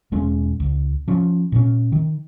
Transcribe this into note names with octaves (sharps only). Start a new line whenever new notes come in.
E1 G#3 C#4
C#2
F3 C#4
A#2 C4 C#4
D#3